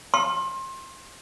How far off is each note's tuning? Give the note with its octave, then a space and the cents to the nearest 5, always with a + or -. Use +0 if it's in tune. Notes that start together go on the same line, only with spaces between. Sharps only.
C6 +25